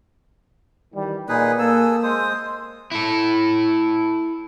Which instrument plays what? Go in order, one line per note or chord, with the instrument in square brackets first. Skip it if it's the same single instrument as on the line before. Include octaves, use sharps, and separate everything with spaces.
[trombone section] D#3 E3 G3
[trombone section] A#2 [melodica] D#4 G#4 B4
[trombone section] A#3 [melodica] G#4 A4 E6
[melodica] G#3 C5 D#6
[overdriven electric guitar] E4 A4